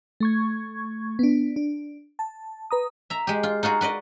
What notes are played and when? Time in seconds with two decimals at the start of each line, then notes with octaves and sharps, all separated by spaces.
0.20 A3 C#6 G#6
1.19 B3 D4
1.56 D4
2.19 A5
2.71 B4 A#5 D#6
3.10 E5 A#5
3.27 G#3 G4
3.43 F4
3.63 D#4 F4 F#4 G#4
3.81 F#4 B4 D5 D#5